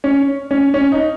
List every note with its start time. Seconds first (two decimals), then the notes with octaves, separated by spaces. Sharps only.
0.04 C#4
0.51 C#4
0.74 C#4
0.92 D#4